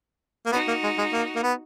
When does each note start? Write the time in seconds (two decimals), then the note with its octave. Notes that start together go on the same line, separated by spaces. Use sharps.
0.46 A#3
0.52 B3 D#4 F#4
0.68 A#3
0.83 G#3
0.98 G#3
1.13 A#3
1.36 A#3
1.43 B3